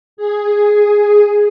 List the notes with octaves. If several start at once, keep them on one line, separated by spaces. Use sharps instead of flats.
G#4